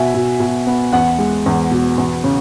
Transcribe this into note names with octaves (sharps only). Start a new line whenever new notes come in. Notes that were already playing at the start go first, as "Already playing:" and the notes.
Already playing: B2 E5 G#5
B2
B2
B3
E2 F#5
G#3
E2
B2
E2
C#3